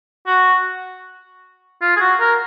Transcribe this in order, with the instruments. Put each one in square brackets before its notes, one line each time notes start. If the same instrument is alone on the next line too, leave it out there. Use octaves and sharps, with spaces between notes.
[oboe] F#4
F4
G#4
F#4
A#4